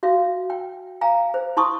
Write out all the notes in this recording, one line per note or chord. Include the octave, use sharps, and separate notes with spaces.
F#4 E5 F5
G5
F5 G#5 A#5
C5
E4 A5 C6 C#6 D#6